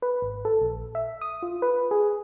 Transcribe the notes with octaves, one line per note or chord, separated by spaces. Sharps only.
B4
G#1
A4
A#1
E5
D#6
F4
B4
G#4